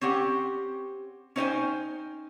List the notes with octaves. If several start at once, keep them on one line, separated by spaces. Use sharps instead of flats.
C4 C#4 G4 F#5
C#4 D#4 C5 D#5 G5 G#5